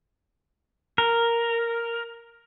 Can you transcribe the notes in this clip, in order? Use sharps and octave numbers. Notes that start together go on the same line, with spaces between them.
A#4